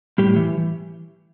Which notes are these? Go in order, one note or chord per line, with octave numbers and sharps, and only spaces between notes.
A2 G3 G4
E3